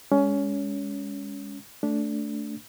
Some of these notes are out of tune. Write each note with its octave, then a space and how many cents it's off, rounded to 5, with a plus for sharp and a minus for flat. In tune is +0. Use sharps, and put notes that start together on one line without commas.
G#3 -20 C#4 +20
A3 +0 D4 -15